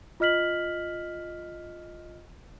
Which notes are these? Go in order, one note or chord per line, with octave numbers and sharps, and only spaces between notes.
F4 D#5 F6 B6 F#7